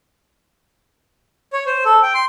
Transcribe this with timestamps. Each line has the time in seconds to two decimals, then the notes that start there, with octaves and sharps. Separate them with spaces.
1.53 C#5
1.67 C5
1.85 A4
2.03 G5
2.14 C6